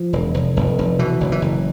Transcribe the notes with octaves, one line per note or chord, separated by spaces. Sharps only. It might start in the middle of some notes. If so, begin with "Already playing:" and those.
Already playing: F3
E1
F1
F1
F1
B2 E3
F#1
E3
F#1